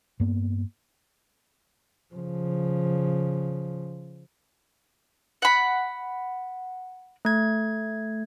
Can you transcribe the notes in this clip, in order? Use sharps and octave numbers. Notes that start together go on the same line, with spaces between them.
G2 A#3 B3
C#3 F3
F#5 B5
A3 G#6